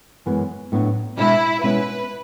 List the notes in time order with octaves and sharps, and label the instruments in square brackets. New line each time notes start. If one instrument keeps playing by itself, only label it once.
[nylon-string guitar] F#2 E3 G#3 B3
A2 F#3 B3 D4
[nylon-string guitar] B2 G#3 B3 D4 F#4 [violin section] E4
[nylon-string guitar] B2 G#3 C#4 E4 G#4 [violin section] B4